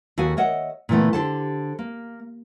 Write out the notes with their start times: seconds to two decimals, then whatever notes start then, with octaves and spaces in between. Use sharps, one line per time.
0.18 D#2 F#4 A4 F5 G#5
0.37 A#4 C#5 D#5 E5 F#5
0.89 A#2 C#3 E3 A3 B3
1.13 D3 G4 A4 C5 A5
1.79 A#3